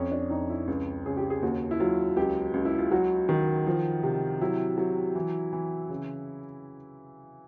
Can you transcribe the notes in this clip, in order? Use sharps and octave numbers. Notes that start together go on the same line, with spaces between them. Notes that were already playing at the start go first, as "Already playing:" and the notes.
Already playing: F2 C#4
D4
F2 D#4
E4
C#2
C#3 G#4
G4
G#4
D#2 F#4
E4
F#3 F4
C#2 G4
C#2
E4
F4
F#3 F#4
D#3
F3
C3
F#3 E4
F#3
E3
E3
C#3